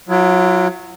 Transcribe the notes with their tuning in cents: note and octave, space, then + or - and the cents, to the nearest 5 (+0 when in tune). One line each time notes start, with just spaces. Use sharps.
F#3 -15 E4 +40